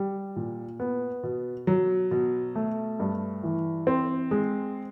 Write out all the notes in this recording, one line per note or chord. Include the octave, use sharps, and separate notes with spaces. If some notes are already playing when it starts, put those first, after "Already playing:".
Already playing: G3
A#2
B3
B2
F#3
B2
A3
G2
E3
C4
G#3